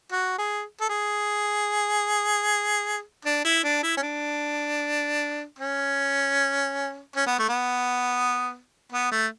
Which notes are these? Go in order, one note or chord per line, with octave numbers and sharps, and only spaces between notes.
F#4
G#4
A4
G#4
D4
E4
D4
E4
C#4
D4
C#4
C#4
B3
A3
B3
B3
A3